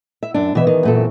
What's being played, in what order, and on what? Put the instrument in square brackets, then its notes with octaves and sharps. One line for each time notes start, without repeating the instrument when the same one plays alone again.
[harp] E4 [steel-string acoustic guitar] E5
[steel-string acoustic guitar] F#2 D4
[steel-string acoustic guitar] B2 E5 [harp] E3 B3 G#4
[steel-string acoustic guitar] D#3
F#2 A#2 A4
[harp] C4 C#6